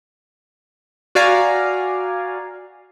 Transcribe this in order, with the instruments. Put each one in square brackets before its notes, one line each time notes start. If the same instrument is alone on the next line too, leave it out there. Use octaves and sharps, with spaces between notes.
[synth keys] F#4 D5 F5 G#5 A#5